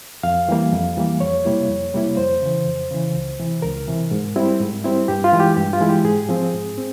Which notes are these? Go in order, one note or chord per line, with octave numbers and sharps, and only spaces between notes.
F2 F5
E3 G3 A#3
F2
E3 G3 A#3
F2 C#5
C3 G3 A#3 E4
F2
C3 G3 A#3 E4
F2 C5
C#3 E3
F2
C#3 E3
C#2
C3 E3
C#2 A#4
C3 E3
G#2
G3 C4 E4
G#2
G3 C4 E4
G2 G4
F4
E3 G#3 E4
G4
G2 G4
F4
E3 G#3 E4
G4
G#2 G#4
F3 C4
G#2
C4